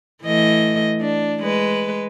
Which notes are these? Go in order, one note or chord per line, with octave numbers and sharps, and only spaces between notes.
E3 A3 D#5
D4
G#3 B4